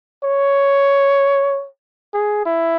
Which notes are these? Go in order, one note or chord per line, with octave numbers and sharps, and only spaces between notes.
C#5
G#4
E4